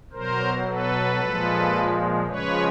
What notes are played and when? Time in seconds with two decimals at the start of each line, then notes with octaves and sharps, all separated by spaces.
0.12 B2 F#3 A#4 C5
0.66 A4 B4
1.20 A#2 F3 G#3
2.26 C#3 F3 G#3 B4 C#5